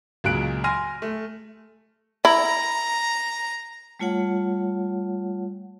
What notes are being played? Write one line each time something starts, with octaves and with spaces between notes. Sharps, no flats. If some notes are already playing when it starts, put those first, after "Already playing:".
C#2 A#2 F#3 G#3 F#6 D7
G#5 C6 F6 A#6 D#7
A3
E4 A#5
G3 A3 F4 C#5 F#5